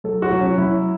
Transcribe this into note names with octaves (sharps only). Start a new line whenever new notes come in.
F#3 A4
F#4
F#3
C#4
F#3 E4